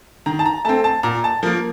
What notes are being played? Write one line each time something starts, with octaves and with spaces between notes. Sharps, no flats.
D#3 A#5
A5
A#5
A3 C4 A5
A5
A#2 A#5
A5
F3 A#3 A#4